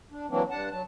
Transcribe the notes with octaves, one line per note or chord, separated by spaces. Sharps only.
D4
E3 F#3 A#3 C4 D4
G2 D4 F#5 A5
F#3 A5